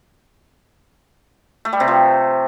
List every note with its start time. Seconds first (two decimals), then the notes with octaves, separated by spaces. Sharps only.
1.65 A3
1.73 G3
1.80 C3
1.88 F3